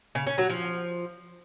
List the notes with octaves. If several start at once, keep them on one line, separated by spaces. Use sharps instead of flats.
C#3
C#4
F#3
F3